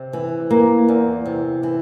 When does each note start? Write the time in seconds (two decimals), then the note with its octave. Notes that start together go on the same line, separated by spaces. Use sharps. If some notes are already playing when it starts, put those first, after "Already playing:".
Already playing: C3
0.13 E3
0.51 A#3
0.89 E2
1.26 C3
1.63 E3